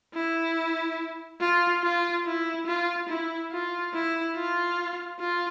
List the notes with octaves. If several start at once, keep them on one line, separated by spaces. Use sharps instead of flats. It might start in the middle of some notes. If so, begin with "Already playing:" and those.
E4
F4
F4
E4
F4
E4
F4
E4
F4
F4